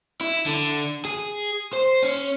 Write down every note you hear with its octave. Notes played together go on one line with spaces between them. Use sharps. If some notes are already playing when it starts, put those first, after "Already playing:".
E4
D3
G#4
C5
C#4